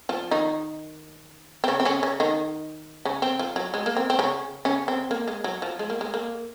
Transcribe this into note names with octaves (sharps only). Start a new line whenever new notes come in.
F3 F4
D#3 D#4
C4
C#3 C#4
C4
C#3 C#4
C#3 C#4
D#3 D#4
C#3 C#4
C4
F3
F#3
G#3
A#3
C4
C4
C#3 C#4
C#3 C#4
C4
A#3
G#3
F#3
F3
G#3
A#3
G#3
A#3